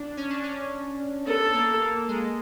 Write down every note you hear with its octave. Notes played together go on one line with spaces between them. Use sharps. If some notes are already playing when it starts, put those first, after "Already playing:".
Already playing: D4
C#4
D4
C#4
B3 A4
A#3
A#3
G#3